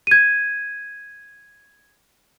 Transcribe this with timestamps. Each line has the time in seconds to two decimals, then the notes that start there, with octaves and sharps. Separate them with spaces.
0.07 G#6 D#7